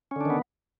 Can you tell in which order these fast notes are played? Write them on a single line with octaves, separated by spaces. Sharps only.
C#4 D3 D4 D#3 B3